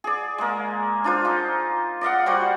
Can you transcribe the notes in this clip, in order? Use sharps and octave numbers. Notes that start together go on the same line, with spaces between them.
G#4 D5
G#3 A#3
D4 F4 C5
D#4 D6
D5 D#5 F5 F#5
G3 F#4 C5 D5